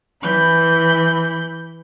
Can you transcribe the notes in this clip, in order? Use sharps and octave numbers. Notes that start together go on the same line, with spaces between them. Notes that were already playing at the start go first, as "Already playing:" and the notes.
E3 B5 G6